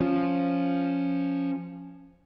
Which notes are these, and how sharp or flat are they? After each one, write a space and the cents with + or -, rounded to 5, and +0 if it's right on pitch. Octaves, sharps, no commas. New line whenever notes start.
F3 +0 C#4 +0